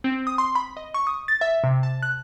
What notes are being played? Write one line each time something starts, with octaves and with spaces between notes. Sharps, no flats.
C4
D#6
C6
B5
D#5
C#6
D#6
A6
E5
C3
A5
F#6